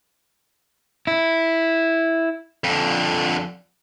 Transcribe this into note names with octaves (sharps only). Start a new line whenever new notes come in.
E4
F2 D3